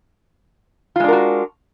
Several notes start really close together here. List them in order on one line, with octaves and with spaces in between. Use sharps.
F4 G#3 D4 A#4 F#4